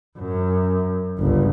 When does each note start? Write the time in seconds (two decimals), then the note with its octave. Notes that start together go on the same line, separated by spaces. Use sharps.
0.18 F#2
1.18 G1 C#2